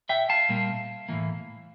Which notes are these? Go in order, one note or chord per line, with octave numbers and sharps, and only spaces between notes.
E5 G5
F5 A5
A#2 G3 A#3
A2 E3 A#3